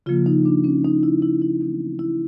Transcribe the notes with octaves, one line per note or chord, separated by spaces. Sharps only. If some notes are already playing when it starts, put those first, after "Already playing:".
C#3 F3 A#3 F4
D#4
D4
C#4
D#4
E4
E4
E4
E3 A3 C4 D#4
E4